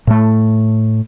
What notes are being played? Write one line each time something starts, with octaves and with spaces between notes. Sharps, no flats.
A2 A3